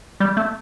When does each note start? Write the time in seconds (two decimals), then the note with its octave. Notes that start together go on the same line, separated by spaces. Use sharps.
0.20 G3
0.37 A3